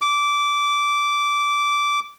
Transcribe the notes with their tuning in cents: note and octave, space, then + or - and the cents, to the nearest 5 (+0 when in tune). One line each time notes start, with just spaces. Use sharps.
D6 -15